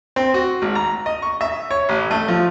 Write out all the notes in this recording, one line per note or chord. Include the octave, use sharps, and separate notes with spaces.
C4
F#4
G#1
A#5
D#5
C#6
E5
C#5
A1
A3
F3